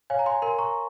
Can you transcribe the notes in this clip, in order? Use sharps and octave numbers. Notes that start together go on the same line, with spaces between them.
C#5 F5 G#5
A#5
G#5 C6
A#4 G#5 C6
A#5 C#6